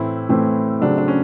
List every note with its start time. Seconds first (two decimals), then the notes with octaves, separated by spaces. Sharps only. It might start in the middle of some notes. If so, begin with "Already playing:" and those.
Already playing: A2 E3 A3 C4 E4
0.29 A2 E3 A3 C4
0.81 C#3 F#3 A3 C4 D4
0.98 D4
1.08 C#4